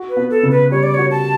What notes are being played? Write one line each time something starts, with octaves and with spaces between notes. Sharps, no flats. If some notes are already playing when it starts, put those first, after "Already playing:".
Already playing: F#4
B4
B3
A4
C#3
B4
G3 C#5
D5
F#4 C#5
A5